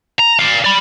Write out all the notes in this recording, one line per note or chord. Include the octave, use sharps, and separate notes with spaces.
A#5
D5 F5
D5 B5